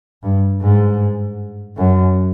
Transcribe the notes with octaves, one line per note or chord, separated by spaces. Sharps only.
G2
G#2
F#2